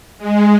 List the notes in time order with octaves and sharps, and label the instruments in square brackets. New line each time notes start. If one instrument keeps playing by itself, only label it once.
[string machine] G#3